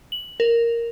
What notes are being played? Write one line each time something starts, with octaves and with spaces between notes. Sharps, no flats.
F#7
A#4